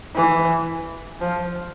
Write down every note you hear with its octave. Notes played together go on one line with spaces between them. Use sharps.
E3
F3